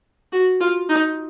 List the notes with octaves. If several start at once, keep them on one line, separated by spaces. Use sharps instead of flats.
F#4
F4
D#4